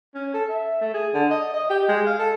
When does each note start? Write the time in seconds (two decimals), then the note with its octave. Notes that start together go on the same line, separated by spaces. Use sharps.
0.14 C#4
0.34 A4
0.50 E5
0.81 A3
0.94 G#4
1.14 D3
1.31 D#5
1.54 D#5
1.70 G4
1.88 G#3
2.06 F5
2.19 A4